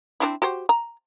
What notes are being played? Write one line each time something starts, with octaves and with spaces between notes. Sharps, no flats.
C4 D4 E4
F#4 G4 C5
A#5